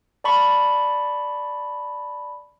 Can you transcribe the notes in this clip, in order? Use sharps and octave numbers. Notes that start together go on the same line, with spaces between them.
D5 A5 B5 C#6